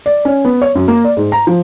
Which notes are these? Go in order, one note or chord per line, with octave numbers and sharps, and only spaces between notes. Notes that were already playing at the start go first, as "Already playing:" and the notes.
D5
C#4
B3
C#5
F#2
A#3
D5
G#2
A#5
F3